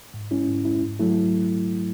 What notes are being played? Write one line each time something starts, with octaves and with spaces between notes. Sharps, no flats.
G#2
G#3 C#4 E4
G#2
G#3 C#4 E4
G#2
F#3 A3 E4